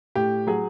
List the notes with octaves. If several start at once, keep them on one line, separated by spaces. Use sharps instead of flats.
A2 G4
F#3 G#4